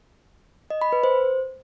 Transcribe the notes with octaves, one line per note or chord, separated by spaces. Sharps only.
D#5
B5
B4
C5